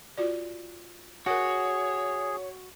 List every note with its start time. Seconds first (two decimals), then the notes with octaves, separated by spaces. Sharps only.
0.18 F4 F#4 D5
1.26 F#4 G#4 A#4 C#5 F#5 G#5